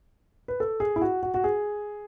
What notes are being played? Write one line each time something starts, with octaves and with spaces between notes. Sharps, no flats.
B4
A4
G#4
E4
F#4
F#4
F#4
G#4